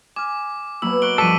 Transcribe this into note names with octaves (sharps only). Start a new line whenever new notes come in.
G#5 D6 F6
B2 F#3 A#3 B5 E6
A#4 C#6 F#6 D7 G7
G2 F3 A4 D6 B6 D#7